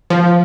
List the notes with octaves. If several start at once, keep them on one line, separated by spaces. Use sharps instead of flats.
F3